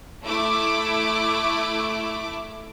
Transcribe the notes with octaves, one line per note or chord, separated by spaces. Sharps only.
A3 E4 D6